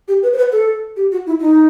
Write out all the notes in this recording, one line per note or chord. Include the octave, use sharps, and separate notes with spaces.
G4
B4
C5
B4
A4
G4
F#4
E4
D#4